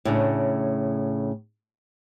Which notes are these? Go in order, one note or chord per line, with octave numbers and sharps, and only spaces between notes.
A2 C#3 D4